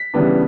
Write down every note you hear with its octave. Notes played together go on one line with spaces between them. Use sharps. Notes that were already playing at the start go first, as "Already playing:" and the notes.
Already playing: B6
C#3 E3 G3 B3 D4